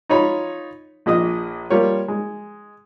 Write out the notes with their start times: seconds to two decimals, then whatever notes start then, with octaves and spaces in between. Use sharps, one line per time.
0.10 D#4 F4 C#5 B5
1.06 A#1 A#2 D#5 D#6
1.70 G3 A#3 F4 C#5
2.08 G#3